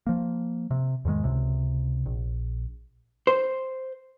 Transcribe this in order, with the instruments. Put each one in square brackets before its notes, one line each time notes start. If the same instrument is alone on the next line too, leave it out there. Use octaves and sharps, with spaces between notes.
[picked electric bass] F3 A#3
C3
E2 G#2 D#3 G#3
C#2 C3
A#1
[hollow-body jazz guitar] C5